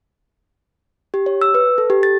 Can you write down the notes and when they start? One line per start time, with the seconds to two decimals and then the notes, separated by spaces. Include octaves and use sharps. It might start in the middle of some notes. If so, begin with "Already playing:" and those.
1.14 G4
1.26 C#5
1.41 E6
1.54 B4
1.78 A4
1.90 G4
2.03 A6